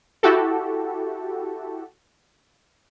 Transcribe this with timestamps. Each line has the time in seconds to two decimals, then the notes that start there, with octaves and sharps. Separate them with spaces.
0.23 E4 F#4 G4 A4